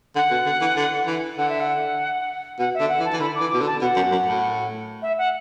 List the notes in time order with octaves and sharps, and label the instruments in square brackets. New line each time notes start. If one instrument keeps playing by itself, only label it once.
[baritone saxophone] D3 [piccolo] F#5
[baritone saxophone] B2
D3
E3
D3
E3
[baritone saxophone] D3 [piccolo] F#5
[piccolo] E5
F#5
[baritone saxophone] B2 [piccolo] F#5
[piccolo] E5
[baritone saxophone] D3
[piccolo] F#5
[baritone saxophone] E3
[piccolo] A5
[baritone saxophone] E3
[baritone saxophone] D3 [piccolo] B5
[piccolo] D6
[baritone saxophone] E3
[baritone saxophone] B2 [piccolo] D6
[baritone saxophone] D3
[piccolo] A5
[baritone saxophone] B2 [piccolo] F#5
[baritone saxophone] F#2
F#2
A2
[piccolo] E5
F#5